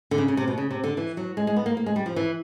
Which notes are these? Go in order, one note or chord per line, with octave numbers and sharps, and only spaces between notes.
D3
C#3
C#3
C3
B2
C#3
C3
D3
E3
F#3
G#3
G#3
B3
A#3
A#3
G#3
G3
F3
E3